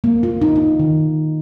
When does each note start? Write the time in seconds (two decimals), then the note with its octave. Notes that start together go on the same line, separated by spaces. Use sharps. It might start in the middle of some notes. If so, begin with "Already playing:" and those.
0.04 A#3
0.23 F4
0.42 D#4
0.56 D#4
0.79 D#3